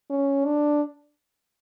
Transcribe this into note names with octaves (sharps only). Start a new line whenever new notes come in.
C#4
D4